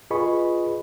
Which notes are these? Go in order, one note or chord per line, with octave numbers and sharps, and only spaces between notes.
F4 G#4 B4 D#5 B5 C#6